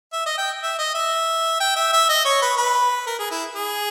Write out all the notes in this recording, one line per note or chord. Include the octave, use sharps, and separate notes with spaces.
E5
D#5
G5
E5
D#5
E5
G5
E5
E5
D#5
C#5
B4
B4
A#4
G#4
E4
G#4